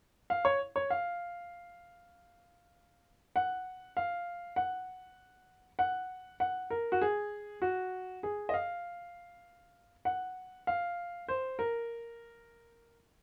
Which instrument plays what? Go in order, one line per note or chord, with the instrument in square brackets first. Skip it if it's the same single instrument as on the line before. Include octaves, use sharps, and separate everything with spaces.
[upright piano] F5
C#5
C#5
F5
F#5
F5
F#5
F#5
F#5
A#4
F#4
G#4
F#4
G#4
D#5
F5
F#5
F5
C5
A#4